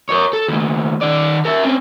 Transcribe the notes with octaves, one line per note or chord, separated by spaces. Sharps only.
A#4 C#5
A4
D#2 A3
D#3 D5
A#4 E5
C4 C#4